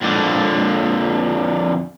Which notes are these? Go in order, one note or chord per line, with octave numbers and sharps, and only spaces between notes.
F2 D3